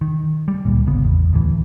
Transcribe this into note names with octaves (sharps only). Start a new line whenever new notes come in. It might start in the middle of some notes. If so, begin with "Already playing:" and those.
D#3
G3
D2 A#2
G#1 C#3 B3
A1 E2
D2 A2 E3